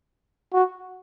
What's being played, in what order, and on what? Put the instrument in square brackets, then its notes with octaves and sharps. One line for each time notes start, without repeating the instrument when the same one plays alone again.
[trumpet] F#4